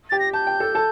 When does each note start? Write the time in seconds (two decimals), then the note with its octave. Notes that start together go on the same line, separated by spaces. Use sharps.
0.10 G4 G5 A6
0.19 A#6
0.33 A5 G6
0.47 G5
0.60 A4 A5
0.75 A4 A5